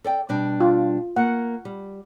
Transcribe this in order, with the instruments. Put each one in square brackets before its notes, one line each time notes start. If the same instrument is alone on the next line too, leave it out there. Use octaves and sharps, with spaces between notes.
[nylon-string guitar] A4 D5 G5
B2 G3 D4
[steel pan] F4
[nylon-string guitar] A#3 [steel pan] F#5
[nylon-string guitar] G3